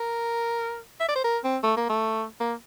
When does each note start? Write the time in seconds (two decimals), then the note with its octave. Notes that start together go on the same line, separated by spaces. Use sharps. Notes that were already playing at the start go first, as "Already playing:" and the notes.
Already playing: A#4
1.00 E5
1.08 D5
1.16 C5
1.24 A#4
1.44 C4
1.63 A3
1.77 A#3
1.89 A3
2.40 A#3